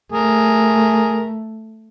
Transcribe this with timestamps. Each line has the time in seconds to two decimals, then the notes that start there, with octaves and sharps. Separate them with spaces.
0.12 A3 G#4 A#4